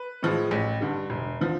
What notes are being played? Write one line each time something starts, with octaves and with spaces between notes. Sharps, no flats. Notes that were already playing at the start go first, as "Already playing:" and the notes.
Already playing: B4
A2 F3 G#3
A1
G2 D3 G3
E1
D3 F3